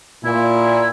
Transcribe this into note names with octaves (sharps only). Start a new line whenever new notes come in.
A#2 E4